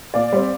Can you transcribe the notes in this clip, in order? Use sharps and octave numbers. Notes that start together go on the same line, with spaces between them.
A#2 D5 F5
G3 C4